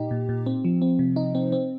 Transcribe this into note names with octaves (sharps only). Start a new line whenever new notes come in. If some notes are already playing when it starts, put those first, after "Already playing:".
Already playing: A#2 D#4 G4
A#2
A#2
C4
F3
C4
C3
D#4
C4
C4